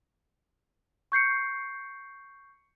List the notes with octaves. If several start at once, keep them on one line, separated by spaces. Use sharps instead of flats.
C#6 G6 C7 C#7